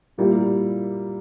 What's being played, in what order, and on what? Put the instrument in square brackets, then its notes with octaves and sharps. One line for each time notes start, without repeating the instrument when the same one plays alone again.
[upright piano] A#2 G3 A#3 E4 G4